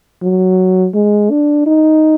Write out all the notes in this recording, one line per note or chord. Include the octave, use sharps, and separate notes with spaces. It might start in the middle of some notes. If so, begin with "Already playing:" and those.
F#3
G#3
D4
D#4